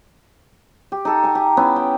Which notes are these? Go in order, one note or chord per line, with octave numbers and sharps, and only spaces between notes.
G4
D#4 A4
G#5 A#5
G4
B3 C#4 E4
G5